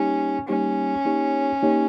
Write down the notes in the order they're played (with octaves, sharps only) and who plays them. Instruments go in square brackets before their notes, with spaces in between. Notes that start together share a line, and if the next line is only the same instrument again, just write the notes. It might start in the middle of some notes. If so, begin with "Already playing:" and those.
Already playing: [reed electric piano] G3 A#3 D#4 G4 [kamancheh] C#4
[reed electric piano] G3 A#3 D#4 G4 [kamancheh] C#4
[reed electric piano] A#3 D#4 G4 C#5
A#3 D#4 G4 C#5